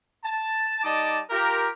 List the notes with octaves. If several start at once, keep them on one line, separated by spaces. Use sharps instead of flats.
A5
G3 D#4 D5 D#5 A5 D6
F4 G4 A#4